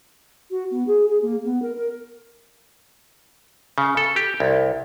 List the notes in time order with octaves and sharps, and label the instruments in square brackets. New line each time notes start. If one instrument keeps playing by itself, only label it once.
[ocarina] F#4
B3
G#4
G#4
A#3
B3
A#4
A#4
[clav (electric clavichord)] C#3
A4
G4
C2